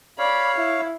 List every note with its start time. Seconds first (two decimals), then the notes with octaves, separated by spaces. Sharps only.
0.19 C#5 D5 F5 B5
0.57 E4